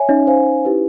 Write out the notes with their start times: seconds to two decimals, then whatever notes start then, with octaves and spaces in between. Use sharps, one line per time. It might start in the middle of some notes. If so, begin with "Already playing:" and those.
Already playing: C#5 E5 G#5
0.09 C#4 D#4
0.27 C5 F5 G#5
0.65 E4 G4 B4